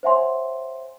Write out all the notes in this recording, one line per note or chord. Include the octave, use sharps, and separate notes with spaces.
C5 C#5 E5 F#5 G#5 C6